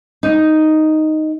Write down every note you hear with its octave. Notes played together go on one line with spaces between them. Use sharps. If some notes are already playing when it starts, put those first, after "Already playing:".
D#4